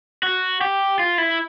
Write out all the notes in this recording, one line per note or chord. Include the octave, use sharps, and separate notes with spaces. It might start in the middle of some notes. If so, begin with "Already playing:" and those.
F#4
G4
F4
E4